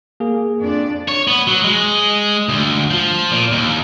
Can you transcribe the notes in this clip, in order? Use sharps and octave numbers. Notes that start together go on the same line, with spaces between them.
A#3 G#4
F2 D4 D5
C#5
B3
F#3
G#3
D2
F3
A#2
D#2